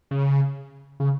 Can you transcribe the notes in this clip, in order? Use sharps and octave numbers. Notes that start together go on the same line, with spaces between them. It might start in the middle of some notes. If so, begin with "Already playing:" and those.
C#3
C#3